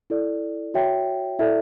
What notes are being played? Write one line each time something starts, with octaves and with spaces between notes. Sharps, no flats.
E4 A4 D5
F#4 C#5 E5 G5
E4 A4 D5 E5